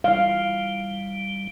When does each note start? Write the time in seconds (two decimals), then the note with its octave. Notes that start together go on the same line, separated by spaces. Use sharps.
0.04 G3 E4 F5